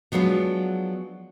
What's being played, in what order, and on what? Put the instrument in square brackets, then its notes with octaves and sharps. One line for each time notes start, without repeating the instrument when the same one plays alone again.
[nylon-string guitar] F3 F#3 G#3 B3 D4